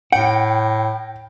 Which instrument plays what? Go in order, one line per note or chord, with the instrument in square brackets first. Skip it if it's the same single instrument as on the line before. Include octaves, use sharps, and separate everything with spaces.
[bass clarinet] A2 [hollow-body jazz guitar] F#5 [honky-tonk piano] G5